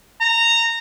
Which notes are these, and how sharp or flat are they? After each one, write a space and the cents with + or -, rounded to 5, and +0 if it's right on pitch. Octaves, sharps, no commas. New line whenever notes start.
A#5 -15